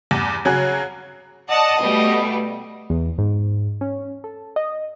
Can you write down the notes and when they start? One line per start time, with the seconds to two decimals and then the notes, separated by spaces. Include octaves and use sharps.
0.11 E2 G2
0.45 C#3 F#3 G#4 F#6
1.49 D5 D#5 F#5 A5
1.80 B2 G3 A3
2.90 E2
3.18 G#2
3.81 C#4
4.24 A4
4.56 D#5